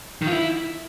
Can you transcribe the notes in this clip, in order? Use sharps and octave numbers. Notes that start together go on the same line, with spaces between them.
D#3
F4
E4